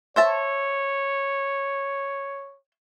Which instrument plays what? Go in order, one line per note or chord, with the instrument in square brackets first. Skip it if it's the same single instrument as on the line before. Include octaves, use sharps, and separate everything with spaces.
[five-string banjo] C5 E5 A5 [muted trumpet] C#5